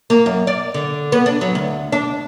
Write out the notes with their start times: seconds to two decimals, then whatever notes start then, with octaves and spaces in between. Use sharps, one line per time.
0.10 A#3
0.26 F#2
0.47 D5
0.74 D3
1.12 B3
1.26 D4
1.41 F#3
1.55 D2
1.92 D4